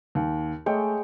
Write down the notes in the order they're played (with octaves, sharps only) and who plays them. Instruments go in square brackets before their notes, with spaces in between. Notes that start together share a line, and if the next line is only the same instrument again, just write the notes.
[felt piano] D#2
[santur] G#3 C#5 G5 [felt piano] A3